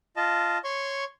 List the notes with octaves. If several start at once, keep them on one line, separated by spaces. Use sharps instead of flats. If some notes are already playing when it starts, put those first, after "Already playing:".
F4 D#5 A5
C#5 C6 C#6